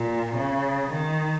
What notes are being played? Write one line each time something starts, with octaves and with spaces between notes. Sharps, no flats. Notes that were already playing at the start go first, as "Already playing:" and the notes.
Already playing: A#2
C#3
D#3